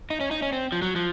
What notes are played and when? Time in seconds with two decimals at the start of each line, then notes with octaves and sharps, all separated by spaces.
0.10 D#4
0.21 C#4
0.31 D#4
0.42 C#4
0.53 C4
0.72 F3
0.82 F#3
0.96 F3